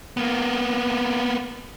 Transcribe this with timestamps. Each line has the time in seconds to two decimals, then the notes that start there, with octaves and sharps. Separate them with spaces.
0.17 A#3 B3